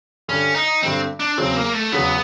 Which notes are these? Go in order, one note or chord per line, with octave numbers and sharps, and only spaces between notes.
G2 D3 G3 C#4
D#4
G2 D3 G3 C4
D4
E2 C#3 F#3 C4
A#3
A3
E2 C#3 F#3 B3